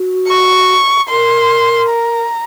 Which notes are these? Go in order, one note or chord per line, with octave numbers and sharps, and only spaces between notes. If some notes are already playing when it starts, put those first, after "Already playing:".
Already playing: F#4
C#6
A#4 C6
A#5